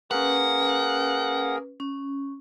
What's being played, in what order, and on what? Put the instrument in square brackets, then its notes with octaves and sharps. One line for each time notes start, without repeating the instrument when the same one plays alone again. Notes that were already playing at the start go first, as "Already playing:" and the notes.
[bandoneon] A#3 G#4 A#4 [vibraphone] C#4 B4 [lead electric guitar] F#5
[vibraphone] C#4